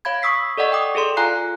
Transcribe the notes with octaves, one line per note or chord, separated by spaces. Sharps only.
C#5 F5 B5 G#6
C#6 D#6 E6 B6 C7
A4 D5 D#5 F#5 C#6
G5 D6 D#6
G#4 A4 D5 C6
F4 F5 G#5 A#5 F#6 C7